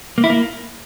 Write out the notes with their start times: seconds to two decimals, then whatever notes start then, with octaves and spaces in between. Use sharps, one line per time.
0.18 A#3
0.24 E4
0.30 A#3